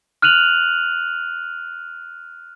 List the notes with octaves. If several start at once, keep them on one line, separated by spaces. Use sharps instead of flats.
F6 F#6 D#7 F7 F#7